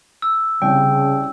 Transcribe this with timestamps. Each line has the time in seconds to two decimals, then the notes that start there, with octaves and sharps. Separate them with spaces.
0.22 E6
0.62 C2 C#3 C#4 G5